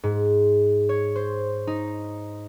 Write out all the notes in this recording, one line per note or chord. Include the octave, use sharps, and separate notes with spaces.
G#2
C#5
C5
D#4